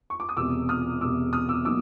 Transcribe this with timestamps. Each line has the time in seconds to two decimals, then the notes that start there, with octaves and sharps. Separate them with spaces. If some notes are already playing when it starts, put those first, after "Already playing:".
0.10 C#6
0.20 D6
0.29 D#6
0.37 E1 E2 C3 D6 E6
0.69 D#6 F6
1.01 E1 E2 C3 D6 E6
1.33 D#6 F6
1.49 D6 E6
1.65 B2 F#3 A#3 D#4 D6 E6